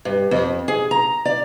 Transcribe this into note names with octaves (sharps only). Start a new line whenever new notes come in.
G2
F2
G#4
A#5
D5